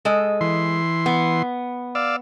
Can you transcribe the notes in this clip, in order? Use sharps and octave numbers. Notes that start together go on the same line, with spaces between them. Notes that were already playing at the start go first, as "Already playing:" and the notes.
G#3 A4 D#5
E3 C6
B3
D5 F5 E6